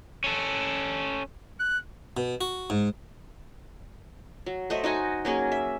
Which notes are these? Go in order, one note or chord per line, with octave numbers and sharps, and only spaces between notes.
C#4 A4
F#6
B2
F#4
G#2
F#3
A3 C5 D#5 E5
D#4 F#4 D#5 G#5
F#3 A#3 C#4 G#4
E5